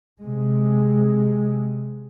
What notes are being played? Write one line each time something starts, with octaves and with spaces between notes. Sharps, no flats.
C3 G#3